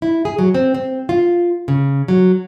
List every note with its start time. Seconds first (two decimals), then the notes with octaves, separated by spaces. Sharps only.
0.02 E4
0.25 G#4
0.39 F#3
0.55 C4
0.75 C4
1.09 F4
1.68 C#3
2.08 F#3